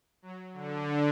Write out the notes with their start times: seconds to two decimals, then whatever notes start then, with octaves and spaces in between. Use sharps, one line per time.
0.22 F#3
0.53 D3